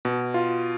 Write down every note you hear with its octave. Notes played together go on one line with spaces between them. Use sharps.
B2
F4